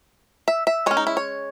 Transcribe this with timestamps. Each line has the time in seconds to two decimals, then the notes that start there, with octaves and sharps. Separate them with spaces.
0.48 E5
0.67 E5
0.86 G#3 C#5
0.91 C#4
0.97 D#4
1.07 E4
1.17 C#5